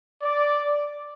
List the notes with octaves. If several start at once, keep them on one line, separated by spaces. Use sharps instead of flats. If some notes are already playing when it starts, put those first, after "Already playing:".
D5